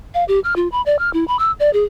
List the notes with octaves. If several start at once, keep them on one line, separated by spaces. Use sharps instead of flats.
F5
G4
F6
F4
B5
D5
F6
E4
B5
E6
D5
G#4